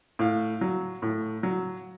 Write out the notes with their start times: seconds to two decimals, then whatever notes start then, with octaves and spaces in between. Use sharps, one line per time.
0.19 A2 F5
0.61 F#3
1.02 A2
1.43 F#3